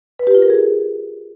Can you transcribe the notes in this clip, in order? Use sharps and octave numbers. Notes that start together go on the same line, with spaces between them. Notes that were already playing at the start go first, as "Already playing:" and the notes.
B4
G4
F4
A#4
G#4